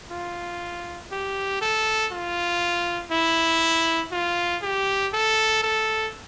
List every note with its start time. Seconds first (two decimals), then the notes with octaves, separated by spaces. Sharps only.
0.11 F4
1.12 G4
1.62 A4
2.12 F4
3.12 E4
4.12 F4
4.62 G4
5.13 A4
5.63 A4